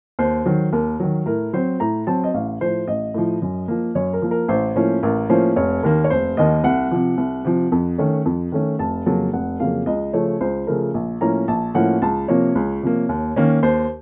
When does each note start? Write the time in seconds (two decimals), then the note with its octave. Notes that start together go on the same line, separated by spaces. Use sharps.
0.19 D#2 C5
0.46 D#3 F#3
0.73 D#2 A#4
1.00 D#3 F#3
1.26 A2 A#4
1.53 F#3 C4 C5
1.80 A2 A#5
2.07 F#3 C4 A5
2.24 D#5
2.34 A1 F5
2.61 A2 F3 C5
2.88 A1 D#5
3.14 A2 F3
3.42 F#2
3.68 F3 A#3
3.95 F#2 C#5
4.13 A#4
4.22 F3 A#3
4.31 A#4
4.48 A1 C5
4.76 A2 F3 A#3 C#4
5.03 A1 A#4
5.29 A2 F3 A#3 C#4 C5
5.56 F1 C#5
5.83 D#2 D#3 A#3 A#4
6.04 C#5
6.10 F1 C5
6.37 D#2 D#3 A#3 D#5
6.64 C2 F#5
6.91 C3 F3
7.18 C2
7.45 C3 F3
7.72 F2
7.98 D#3 A3 C#4
8.25 F2
8.52 D#3 A3 C#4
8.79 F1 A5
9.06 F2 C#3 F#3 A#3 A5
9.33 F1 F#5
9.60 F2 C#3 F#3 A#3 F5
9.86 C#2 D#5
10.13 C#3 F3 A3 C#5
10.41 C#2 C5
10.67 C#3 F3 A3 A#4
10.94 A#1
11.21 A2 F3 A#3 C#4 A#5
11.48 A#1 A5
11.75 A2 F3 A#3 C#4 F#5
12.02 C#2 A5
12.28 C3 F3 A#3 C#5
12.55 C#2
12.82 C3 F3 A#3
13.09 D#2
13.36 D#3 A#3 C#4
13.63 D#2 C5